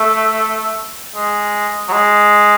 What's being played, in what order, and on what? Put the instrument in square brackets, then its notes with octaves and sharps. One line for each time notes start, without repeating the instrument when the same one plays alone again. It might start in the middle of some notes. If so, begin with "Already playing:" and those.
Already playing: [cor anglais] A3
G#3
F#3
G#3